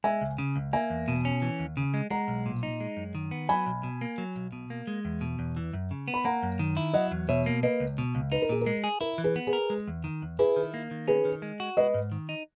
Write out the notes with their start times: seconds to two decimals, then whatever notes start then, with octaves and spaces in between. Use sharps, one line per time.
0.04 G#3 E5 G#5
0.21 C#2
0.38 C#3
0.56 C#2
0.73 A#3 E5 G#5
0.90 E2
1.08 B2
1.25 C#4
1.42 E3
1.59 D#2
1.77 C#3
1.94 G#3
2.10 G#3 F#5 A#5
2.28 B1
2.46 A#2
2.63 D#4
2.80 G#3
2.97 F#2
3.15 D#3
3.31 B3
3.49 F#3 G#5 B5
3.67 B1
3.83 B2
4.01 A#3
4.18 F#3
4.36 B1
4.52 B2
4.70 A#3
4.87 G#3
5.05 E2
5.21 B2
5.39 E2
5.57 E3
5.73 F#2
5.91 C#3
6.08 B3
6.14 B5
6.25 A#3 F#5 A#5
6.43 F#2
6.59 D#3
6.77 E4
6.94 F#3 D#5 F#5
7.11 E2
7.29 B2 C#5 E5
7.46 A#3
7.63 A#3 B4 D#5
7.80 C#2
7.98 B2
8.15 C#2
8.32 D#4 B4
8.42 A#4
8.49 A#2 G#4
8.61 A#4
8.66 G#3
8.84 G#4
9.01 E4 A#4
9.18 E3
9.24 G#4 B4
9.36 B3
9.47 G#4 B4
9.53 A#4
9.70 G#3
9.88 E2
10.04 D#3
10.22 E2
10.39 E4 G#4 B4
10.56 D#3
10.74 A#3
10.91 D#3
11.08 C#4 G#4 B4
11.25 D#3
11.42 G#3
11.60 F#4
11.77 G#3 B4 D#5
11.94 G#2
12.12 D#3
12.29 D#4